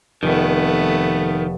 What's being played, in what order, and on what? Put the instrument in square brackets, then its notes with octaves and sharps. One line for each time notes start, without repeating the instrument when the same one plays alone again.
[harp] F1 [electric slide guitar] D#3 [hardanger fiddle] A3 B3